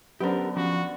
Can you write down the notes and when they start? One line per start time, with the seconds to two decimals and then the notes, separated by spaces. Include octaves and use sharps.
0.20 D3 F#3 B3 C#4 G4 A#4 C5
0.56 F3 C#4 F#4